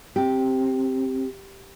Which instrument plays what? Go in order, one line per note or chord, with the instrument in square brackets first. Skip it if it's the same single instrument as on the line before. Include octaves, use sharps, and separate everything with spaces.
[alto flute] C4 [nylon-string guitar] G4